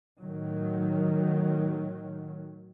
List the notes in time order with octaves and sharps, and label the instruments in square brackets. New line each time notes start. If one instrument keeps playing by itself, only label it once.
[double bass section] A2 D#3 F#3